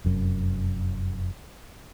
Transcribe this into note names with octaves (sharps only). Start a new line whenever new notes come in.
F1 F#2